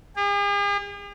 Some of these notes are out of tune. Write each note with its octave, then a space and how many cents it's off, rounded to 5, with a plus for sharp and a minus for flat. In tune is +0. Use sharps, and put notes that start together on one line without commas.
G#4 -45